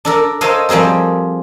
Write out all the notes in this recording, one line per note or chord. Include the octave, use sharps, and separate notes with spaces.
D4 A4 A#4
A4 A#4 C5 C#5 D#5 F5
F3 G3 C4 G#4 A#4